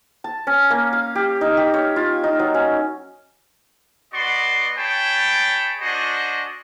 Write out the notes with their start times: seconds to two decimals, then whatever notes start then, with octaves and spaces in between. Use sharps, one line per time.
0.24 A5
0.47 C#4
0.70 A#3
0.93 F5
1.15 G4
1.41 D#4
1.57 G4
1.74 C#5
1.96 F4
2.24 D#4
2.39 F#3
2.54 C#4
4.13 B3 F#4 D5 D#5 C6
4.77 G#4 C#5 G5 A5 B5
5.81 D4 F#4 C5 D#5 G#5